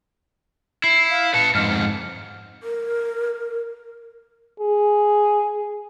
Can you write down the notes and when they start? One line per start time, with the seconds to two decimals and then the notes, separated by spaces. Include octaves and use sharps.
0.84 E4 C7
1.10 F5
1.34 B4 A5 C#7
1.55 F2 G#2 F6
2.63 A#4
4.60 G#4